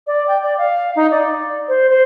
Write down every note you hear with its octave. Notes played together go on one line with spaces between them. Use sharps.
D5
G5
D5
F5
D#4
D5
C5
C5